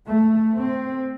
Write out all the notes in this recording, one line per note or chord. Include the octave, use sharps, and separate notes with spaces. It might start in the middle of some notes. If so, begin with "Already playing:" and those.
A3
C4